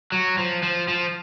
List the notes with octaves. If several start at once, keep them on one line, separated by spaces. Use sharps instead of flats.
F#3
F3
F3
F3